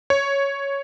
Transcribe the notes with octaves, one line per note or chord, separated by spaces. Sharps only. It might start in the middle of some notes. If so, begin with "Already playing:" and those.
C#5